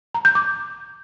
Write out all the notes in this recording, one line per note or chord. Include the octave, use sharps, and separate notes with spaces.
A#5
G6
D6